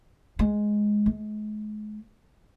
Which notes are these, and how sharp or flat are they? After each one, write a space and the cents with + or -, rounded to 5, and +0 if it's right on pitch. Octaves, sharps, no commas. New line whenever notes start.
G#3 +5
G#3 +40